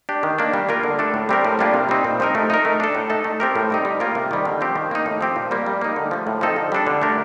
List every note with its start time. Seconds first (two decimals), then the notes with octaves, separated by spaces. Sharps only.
0.09 D4 G4
0.23 D#3
0.39 A#3 D4
0.54 G3
0.69 A#3 F4 A#4
0.83 D3
0.99 A3 D4 A4
1.14 A2
1.29 G3 C4 G4 A#4
1.45 A2
1.59 G3 A#3 D4 F4
1.74 C3
1.89 G3 C4 D#4
2.04 A#2
2.20 F3 C4 D#4 A#4
2.35 A3
2.50 D#4 A#4
2.65 A3
2.80 D4 A4
2.95 A2
3.10 A3 D#4 A4
3.24 A3
3.40 C4 G4 A#4
3.55 A2
3.70 G3 C4 D#4
3.85 G3
4.00 A#3 F4 A#4
4.15 C3
4.31 D#3 G3
4.45 D3
4.61 F3 C4 G4
4.76 D#3
4.91 A#3 D#4
5.06 A2
5.21 F3 C4 G4
5.36 A#2
5.51 G3 A#3
5.66 G3
5.81 A#3 D#4
5.96 D3
6.11 F3 A3
6.27 A2
6.41 F3 C4 D#4 A4
6.56 D3
6.72 G3 D4 A4
6.87 D3
7.02 A3 D4 G4 A#4